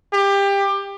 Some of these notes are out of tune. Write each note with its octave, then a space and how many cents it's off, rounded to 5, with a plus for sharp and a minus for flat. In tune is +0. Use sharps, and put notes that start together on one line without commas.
G4 +20